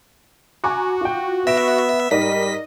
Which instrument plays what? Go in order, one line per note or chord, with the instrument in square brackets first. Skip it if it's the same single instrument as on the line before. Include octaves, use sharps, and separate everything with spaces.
[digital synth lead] F#4 [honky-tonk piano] G#5 A#5 D6
[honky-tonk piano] F4 G5
[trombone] B3 [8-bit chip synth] E5 [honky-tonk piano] A#6 D7 E7
[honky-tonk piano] G#2 A#4 D5 [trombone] G3 [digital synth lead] D#5 [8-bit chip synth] B6